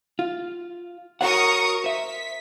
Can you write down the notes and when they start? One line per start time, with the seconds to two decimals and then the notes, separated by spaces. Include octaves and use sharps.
0.19 F4
1.21 F#4 A#4 C#5 F#5 C#6 D#6
1.84 C5 E5 B6